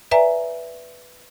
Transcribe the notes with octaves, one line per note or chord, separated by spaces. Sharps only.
B4 D5 E5 G#5 A#5